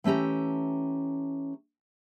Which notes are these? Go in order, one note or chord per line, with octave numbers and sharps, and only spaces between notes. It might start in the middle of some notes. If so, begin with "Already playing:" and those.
E3 A3 C#4 G4 A#5